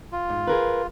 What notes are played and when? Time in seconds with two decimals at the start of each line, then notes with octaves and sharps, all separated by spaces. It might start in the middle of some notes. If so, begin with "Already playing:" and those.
0.12 F4
0.30 G#2
0.47 G#4 A#4 B4